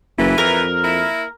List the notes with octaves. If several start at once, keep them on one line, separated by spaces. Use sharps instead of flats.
F#1 E3
F2 A#4
A#3 E4